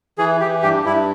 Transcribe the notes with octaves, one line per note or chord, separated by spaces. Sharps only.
E3 G#4
E3 G4
G2 G4
G2 E4